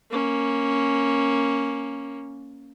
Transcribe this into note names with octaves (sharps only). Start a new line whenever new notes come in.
A#3 C#4